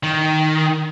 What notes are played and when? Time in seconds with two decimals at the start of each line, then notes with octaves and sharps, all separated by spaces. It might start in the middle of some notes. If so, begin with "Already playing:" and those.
0.04 D#3